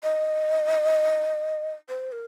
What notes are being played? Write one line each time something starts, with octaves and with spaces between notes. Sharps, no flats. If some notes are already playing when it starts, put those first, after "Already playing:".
D#5
C5
A#4